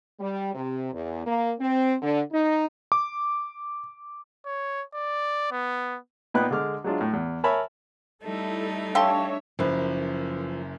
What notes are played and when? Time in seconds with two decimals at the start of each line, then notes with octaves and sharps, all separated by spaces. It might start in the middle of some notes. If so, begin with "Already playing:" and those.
0.20 G3
0.55 C3
0.93 E2
1.26 A#3
1.59 C4
2.01 D3
2.32 D#4
2.92 D6
4.46 C#5
4.94 D5
5.51 B3
6.34 A#2 B3 D#4 B4 G5 F#6
6.51 D3 G#3 D6 F6
6.84 F#3 G#3 D4 F4
7.01 A2
7.13 E2
7.44 A#4 C#5 E5 G#5 A5 B5
8.23 G3 A3 D#4 E4 A4
8.95 D4 G4 A4 C#5 E5 F5 A5 C6
9.59 F#1 F#2 F3 B4